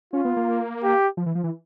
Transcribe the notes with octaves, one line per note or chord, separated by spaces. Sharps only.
C#4 F4
B3
A#3
G4
F3
E3
F3
E3